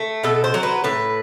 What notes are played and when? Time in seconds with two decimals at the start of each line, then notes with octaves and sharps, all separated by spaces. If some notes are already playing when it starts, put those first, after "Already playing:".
Already playing: A3
0.24 B2 A4
0.44 C5
0.54 F#3
0.63 B4
0.84 A2 B4